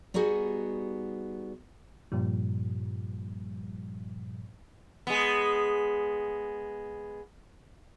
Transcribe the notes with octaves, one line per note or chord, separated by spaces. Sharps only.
G3 B3 D#4 F#4 G#4
G2 A#2 F3 G3
G#3 B3